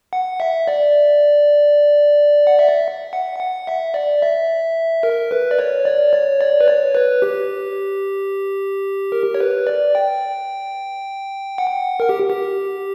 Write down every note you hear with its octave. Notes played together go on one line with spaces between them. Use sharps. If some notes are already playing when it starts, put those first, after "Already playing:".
F#5
E5
D5
F#5
E5
F#5
F#5
E5
D5
E5
A#4
B4
D5
C#5
D5
C#5
D5
B4
C#5
B4
G4
A#4
C#5
B4
D5
G5
F#5
A#4
G4
G4